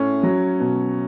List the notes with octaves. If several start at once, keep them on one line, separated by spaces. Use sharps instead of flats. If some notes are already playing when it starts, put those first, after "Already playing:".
Already playing: A2 C#4
F#3
B2